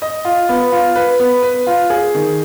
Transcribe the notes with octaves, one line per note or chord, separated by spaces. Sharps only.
D#5
F4
B3
F4
B4
B3
B4
F4
G#4
D#3